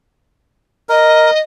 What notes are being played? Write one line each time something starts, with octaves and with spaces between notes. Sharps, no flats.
A#4 D#5